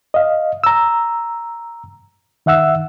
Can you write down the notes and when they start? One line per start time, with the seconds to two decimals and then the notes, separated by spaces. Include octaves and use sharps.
0.14 D#5 F5
0.64 A#5 E6
2.46 D#3 E5 F#5 E6